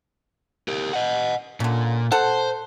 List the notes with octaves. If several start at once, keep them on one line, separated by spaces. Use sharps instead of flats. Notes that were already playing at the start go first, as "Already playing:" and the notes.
G4 A#4
D#5 F#5
A#2 D3 C#4
A4 C5 F#5